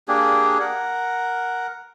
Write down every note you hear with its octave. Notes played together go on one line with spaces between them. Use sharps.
A#3 D4 G4 G#4
A#4 F#5